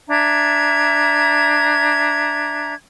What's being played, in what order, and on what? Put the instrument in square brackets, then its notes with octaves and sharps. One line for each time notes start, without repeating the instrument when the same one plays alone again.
[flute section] D4 E5 A#5 G#6